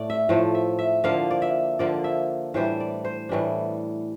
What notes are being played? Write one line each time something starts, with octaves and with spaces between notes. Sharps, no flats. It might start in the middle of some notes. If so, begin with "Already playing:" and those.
Already playing: A2 A3 D5
E5
A2 F3 A3
E5
E5
D3 F3 A#3 F5
D5
E5
D3 F3 A#3 D5
E5
A2 E3 G3 D4 C5
D5
C5
A2 E3 G3 D4